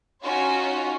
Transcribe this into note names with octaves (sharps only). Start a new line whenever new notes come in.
C#4 D#4 F4 F#4 C#5